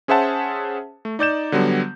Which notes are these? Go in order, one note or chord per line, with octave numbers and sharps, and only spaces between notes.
C#4 G#4 C5 E5 F#5 A5
A3
D#4 D5 G6 E7
D3 F#3 G3 B3